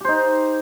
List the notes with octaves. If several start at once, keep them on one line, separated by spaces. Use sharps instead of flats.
D#4 G4 C5